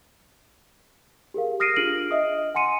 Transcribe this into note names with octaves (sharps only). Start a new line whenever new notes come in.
G4 G#4 A#4 F5
D#6 F6 A#6 C7 D7 D#7
D4 F4 G#4 F6 D7 F#7
D#5 E5 D#6
F#5 G#5 C6 C#7 D#7